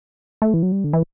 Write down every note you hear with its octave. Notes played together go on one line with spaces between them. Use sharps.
A3
E3
F#3
G3
D3
E3